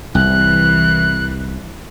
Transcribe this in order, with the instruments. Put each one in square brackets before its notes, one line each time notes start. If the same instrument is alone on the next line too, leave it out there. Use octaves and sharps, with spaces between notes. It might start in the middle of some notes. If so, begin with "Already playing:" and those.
[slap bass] C2 [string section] E3 [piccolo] F#6